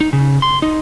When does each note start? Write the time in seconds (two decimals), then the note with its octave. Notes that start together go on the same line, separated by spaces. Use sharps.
0.01 D#4
0.13 C#3
0.42 C6
0.62 D#4